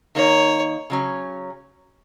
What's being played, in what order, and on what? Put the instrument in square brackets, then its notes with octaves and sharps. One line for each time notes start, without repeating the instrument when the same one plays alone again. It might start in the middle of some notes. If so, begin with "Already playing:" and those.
[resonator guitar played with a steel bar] D#3 A#3 D#4 [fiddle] C#5
[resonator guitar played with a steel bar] C#3 F#3 C#4